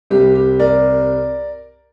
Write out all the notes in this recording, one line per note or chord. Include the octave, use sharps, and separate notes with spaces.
C2 C3 G3 C4 G4
G4
A#4 D5